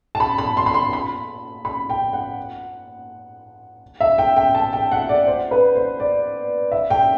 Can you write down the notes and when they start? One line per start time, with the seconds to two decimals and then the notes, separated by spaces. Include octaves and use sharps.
0.15 A5
0.20 B5
0.38 B5
0.57 C6
0.66 B5
0.74 C6
0.93 B5
1.65 B5
1.90 G5
2.13 F#5
4.01 E5
4.18 G5
4.37 G5
4.55 A5
4.73 G5
4.92 F#5
5.09 D5
5.27 C5
5.51 B4
5.75 C5
6.00 D5
6.72 E5
6.90 G5